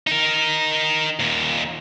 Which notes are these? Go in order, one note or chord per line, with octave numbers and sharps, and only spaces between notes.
D#4 A#4
D#2 A#2